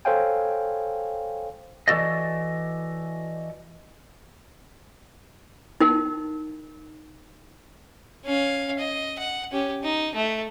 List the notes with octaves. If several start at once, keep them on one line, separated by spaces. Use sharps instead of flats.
A4 C5 C#5 F5 G5 G#5
E3 G#3 F#4 A4 D5 D#5
D#4 A#4
C#4 F5
D#5
F#5
C#4 G4
D#4
A3